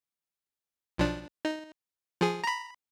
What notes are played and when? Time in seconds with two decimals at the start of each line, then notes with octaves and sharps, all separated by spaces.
0.98 B1 F3 D4
1.45 D#4
2.21 F3 G#4
2.44 A#5 B5